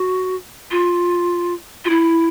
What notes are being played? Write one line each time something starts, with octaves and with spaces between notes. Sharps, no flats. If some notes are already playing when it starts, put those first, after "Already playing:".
Already playing: F#4
F4
F4
E4